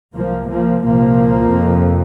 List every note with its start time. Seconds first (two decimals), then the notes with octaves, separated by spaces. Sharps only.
0.15 C2 C3 F3 A#3
0.49 F3 A#3
0.84 C2 A#2 F3 A#3
1.53 F2 C3